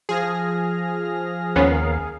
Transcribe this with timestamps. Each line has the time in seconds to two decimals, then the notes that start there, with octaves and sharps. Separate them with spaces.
0.09 F3 G#4 F6 A#6
1.56 D#2 G#2 B3 C#4 A#4 F5